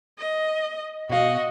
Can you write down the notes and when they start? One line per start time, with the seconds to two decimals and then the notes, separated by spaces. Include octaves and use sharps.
0.19 D#5
1.10 B2 F#4 D#5 F5